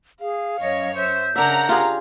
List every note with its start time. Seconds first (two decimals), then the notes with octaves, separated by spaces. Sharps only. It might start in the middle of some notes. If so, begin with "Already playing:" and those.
0.21 G#4 F5
0.60 F#2 C#5 D#5
0.96 C5 E5 G6
1.36 C#3 D4 A#4 E5 F#5 A#5
1.69 F4 G4 G#4